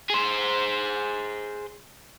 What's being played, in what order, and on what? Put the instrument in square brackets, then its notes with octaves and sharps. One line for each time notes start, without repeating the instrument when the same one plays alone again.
[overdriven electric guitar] G#4 C5